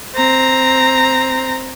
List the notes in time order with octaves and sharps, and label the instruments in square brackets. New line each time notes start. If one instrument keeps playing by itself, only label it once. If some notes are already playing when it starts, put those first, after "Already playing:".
[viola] C4 A#5